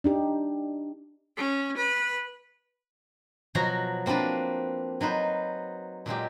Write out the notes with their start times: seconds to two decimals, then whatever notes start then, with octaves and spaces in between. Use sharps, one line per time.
0.04 D4 D#4 G4
1.37 C#4
1.77 B4
3.55 B2 F3 F#3 F#4 A#5
4.06 A#3 C4 D4 B4 A5
5.01 F#3 D#4 B4 C5
6.06 A#2 F#3 G#3 G4